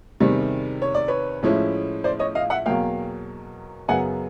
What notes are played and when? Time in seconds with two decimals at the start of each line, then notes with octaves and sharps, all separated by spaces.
0.20 E2 C3 D#3 G3
0.82 C#5
0.95 D5
1.08 B4 C#5
1.43 A2 F3 G#3 C#4 E4
2.04 C5 D5
2.19 C#5 D#5
2.35 D#5 F5
2.50 E5 F#5
2.66 E2 B2 F#3 A#3 F5 G5
3.88 F#2 C#3 F#3 B3 F#5 G#5